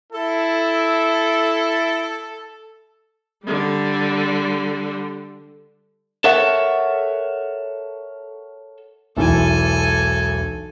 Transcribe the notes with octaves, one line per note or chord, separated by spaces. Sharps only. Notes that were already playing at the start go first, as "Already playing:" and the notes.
E4 A4
D3 G3
A4 A#4 C#5 E5 F#5
E1 B1 E3 A4 G#5